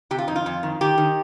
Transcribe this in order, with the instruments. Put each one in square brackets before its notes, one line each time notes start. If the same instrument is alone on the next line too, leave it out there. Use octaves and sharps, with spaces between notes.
[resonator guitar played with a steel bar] C3 G4
F4
F2 D#4
F4
F2
D#3
D#3 G4
D#3